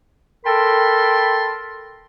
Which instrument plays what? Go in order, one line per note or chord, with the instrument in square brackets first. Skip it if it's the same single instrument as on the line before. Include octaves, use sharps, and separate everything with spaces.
[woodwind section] A4 A#4 G5 A5 B5 C6